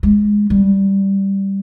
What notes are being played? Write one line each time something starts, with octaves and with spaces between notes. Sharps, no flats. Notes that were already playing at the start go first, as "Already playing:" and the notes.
G#3
G3